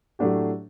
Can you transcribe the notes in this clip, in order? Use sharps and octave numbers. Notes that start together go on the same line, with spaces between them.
A2 F#3 A3 D4 G4